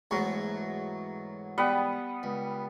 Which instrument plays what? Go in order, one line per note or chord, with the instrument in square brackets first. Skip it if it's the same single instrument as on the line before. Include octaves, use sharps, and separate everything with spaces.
[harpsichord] E2 G#2 A3 [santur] F#3 F#4 C#6
[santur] G3 B3 F#5
[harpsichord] C#2